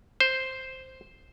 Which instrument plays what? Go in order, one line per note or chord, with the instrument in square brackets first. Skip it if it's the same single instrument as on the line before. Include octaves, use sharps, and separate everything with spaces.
[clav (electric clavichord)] C5